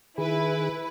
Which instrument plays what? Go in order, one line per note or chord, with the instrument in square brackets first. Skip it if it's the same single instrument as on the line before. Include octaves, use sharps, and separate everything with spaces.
[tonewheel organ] D#3 G#4 [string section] E4 B4